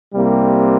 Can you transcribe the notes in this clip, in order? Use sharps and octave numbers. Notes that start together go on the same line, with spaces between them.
C2 C3 G3 A#3